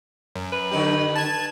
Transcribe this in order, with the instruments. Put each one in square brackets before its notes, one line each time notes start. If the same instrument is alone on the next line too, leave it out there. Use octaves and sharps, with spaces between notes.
[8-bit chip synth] F#2
[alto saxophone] B4
[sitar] D3 D#4 G4
[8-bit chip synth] A5 G#6